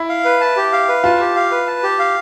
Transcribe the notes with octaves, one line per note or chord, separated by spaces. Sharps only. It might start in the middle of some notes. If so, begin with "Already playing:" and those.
Already playing: E4
F5
B4
A5
G4
F5
B4
F4 A5
G4
F5
B4
A5
G4
F5